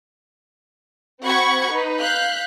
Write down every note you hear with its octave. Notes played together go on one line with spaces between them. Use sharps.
C4 F#4 F#5 B5 C#6 G#6
D#4 B4
F5 F#6 G6 B6